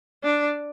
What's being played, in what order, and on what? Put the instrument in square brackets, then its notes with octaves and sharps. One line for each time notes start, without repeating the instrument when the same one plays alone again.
[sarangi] D4